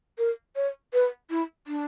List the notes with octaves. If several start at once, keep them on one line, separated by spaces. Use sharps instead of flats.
A#4
C#5
B4
E4
D4